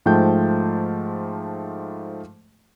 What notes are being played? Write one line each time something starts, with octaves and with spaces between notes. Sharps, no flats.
G#2 F3 A3 G5 A5 G6